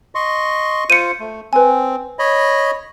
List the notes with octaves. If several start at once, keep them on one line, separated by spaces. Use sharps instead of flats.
D#5 C6 C#6
F4 C5 C#7 D#7
A3
C4 B4 G#5
C#5 D#5 B5